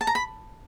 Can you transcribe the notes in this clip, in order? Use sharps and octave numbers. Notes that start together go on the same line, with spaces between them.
A5
A#5
B5